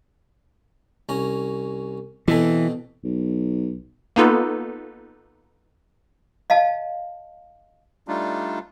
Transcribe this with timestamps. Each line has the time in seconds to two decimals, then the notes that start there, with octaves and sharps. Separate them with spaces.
1.09 C2 C#4 A#5
2.28 B2 E3 C4 A4
3.04 B1
4.16 A#3 B3 D#4 F4 A4 B4
6.50 D#5 F5 A5
8.08 G3 A3 D4 D#4 F4